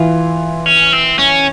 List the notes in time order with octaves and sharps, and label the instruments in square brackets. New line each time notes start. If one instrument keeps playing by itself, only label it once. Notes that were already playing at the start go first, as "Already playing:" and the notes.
Already playing: [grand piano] E3 [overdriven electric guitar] F4
[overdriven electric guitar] C#4
C4
C#4